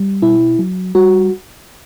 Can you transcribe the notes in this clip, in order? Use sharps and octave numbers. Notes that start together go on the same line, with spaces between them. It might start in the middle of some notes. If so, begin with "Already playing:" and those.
Already playing: G3
B2 E4
F#3
G3 F#4